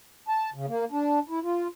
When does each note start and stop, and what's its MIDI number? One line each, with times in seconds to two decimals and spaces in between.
0.28 0.50 81
0.54 0.66 49
0.68 0.85 58
0.91 1.19 62
1.29 1.39 64
1.43 1.68 65